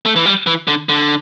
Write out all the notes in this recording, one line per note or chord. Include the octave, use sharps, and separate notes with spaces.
A3
E3
G3
E3
D3
D3